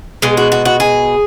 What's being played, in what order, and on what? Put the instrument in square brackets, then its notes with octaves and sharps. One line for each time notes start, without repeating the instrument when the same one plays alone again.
[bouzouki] B2 G#3 G#4
F#4
F#4
F#4
G#4